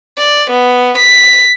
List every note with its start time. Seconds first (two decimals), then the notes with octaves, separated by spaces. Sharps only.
0.18 D5
0.50 B3
0.98 B6